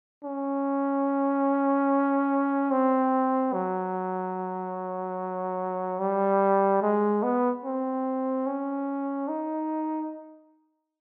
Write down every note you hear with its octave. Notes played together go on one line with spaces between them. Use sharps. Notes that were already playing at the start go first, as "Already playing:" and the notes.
C#4
C4
F#3
G3
G#3
B3
C4
C#4
D#4